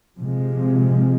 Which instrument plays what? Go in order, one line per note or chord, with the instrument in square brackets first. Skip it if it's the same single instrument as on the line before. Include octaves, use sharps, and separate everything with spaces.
[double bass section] C3 F3 G#3